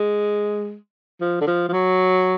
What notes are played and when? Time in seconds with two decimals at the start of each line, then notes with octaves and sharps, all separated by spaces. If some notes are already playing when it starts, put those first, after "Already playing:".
Already playing: G#3
1.21 F3
1.41 D3
1.47 F3
1.68 F3
1.72 F#3